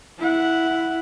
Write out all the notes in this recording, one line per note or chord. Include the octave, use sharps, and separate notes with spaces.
E4 F#5